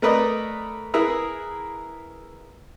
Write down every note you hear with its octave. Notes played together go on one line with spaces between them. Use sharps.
A3 A#4 B4 D5 D#5
E4 G#4 A#4 B4 E5 A#5